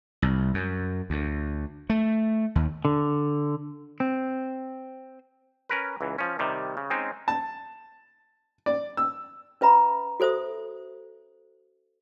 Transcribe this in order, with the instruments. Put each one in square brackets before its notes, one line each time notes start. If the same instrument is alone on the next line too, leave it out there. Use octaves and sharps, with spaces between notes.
[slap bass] C2
F#2
D2
A3
D#2
[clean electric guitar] D3
C4
[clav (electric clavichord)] C#4 A#4 B4
C#2 E3
F3 C#4
C3 D#3 G3
C#3
G#3 C4 C#4 D#4
[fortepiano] A5
D5
E6
[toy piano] C#4 B4 E5 A#5 B5
F#4 A4 C5 E5 D#6